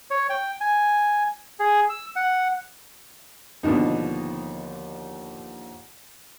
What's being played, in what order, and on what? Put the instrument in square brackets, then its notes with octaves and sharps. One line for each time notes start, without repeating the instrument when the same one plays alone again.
[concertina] C#5
G5
G#5
G#4
E6
F#5
[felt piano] D#2 D3 F3 [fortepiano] B2 D4 D#4